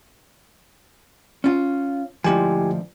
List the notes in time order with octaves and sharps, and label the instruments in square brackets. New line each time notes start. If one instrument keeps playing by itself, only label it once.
[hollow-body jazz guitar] C#4 F4
[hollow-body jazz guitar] D2 G#2 F3 [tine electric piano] E4 G4 G#5